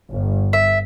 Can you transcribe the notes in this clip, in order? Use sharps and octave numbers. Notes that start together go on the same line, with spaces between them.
G1
E5